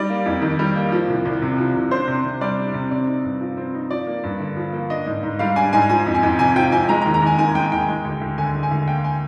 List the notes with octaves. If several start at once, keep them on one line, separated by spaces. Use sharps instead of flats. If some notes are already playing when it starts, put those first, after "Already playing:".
Already playing: G3 D#4 D5
A#3
F2
D#3
G3
A#3
F3
C2
C2
C3
F3
C2
D4 C5
C3
C3
G3 D5
D4
C3
C4 D5
D#4
G2
F3
C4
D#4
F3 D5
A#3
G2
D3
F3
A#3
D4 D#5
G#2
G#2
G3 F5
D4 G#5
G#2 G#5
F3 G#5
F2
G#5
F2
C3 G#5
F3 G5
F2 G#5
G#3 A#5
A#5
D#2
A#5
D#2 G#5
D#3 G#5
G#3 G5
D#2 G5
G#3
D2
D2
D3 G#5
G#3
G#5
D2
A#3 G5
G#5